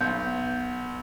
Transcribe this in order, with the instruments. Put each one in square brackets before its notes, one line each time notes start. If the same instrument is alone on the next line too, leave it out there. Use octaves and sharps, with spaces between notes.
[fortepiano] B1 [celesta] G6